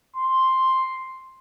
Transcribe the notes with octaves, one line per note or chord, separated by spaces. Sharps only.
C6